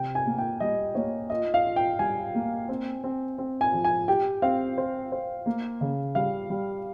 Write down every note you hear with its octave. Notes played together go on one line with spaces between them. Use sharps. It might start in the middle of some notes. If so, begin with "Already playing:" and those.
Already playing: C3 G5
G#5
A#3
G5
G3 D#5
A#3 C#5
F4 D#5
F5
F4
G5
G3 G#5
A#3
C4
C4
C4
G#5
F3
G#5
G4 G5
C4 F5
C5
C5
A#3
C#3
G3 F5
G3